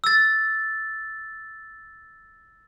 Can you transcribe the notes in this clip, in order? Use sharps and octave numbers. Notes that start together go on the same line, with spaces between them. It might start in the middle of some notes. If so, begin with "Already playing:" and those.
E6 A6